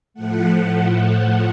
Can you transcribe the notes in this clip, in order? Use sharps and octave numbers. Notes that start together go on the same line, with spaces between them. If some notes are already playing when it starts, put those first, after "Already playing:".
A2 F3 A3 F#5